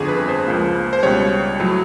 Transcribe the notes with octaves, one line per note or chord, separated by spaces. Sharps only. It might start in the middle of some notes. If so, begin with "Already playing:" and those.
Already playing: G1 F2 D3 G#4
B4
C5
C#2 C#3 F3 A#3
C5
C#2 B2 G3 C#5
A2 F#3